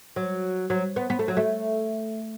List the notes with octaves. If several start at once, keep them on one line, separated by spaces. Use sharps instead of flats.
F#3
F#3
B3
B3
A3
F#3
A3